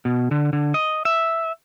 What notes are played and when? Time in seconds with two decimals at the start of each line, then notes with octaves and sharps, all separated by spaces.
0.05 B2
0.31 D3
0.53 D3
0.74 D#5
1.05 E5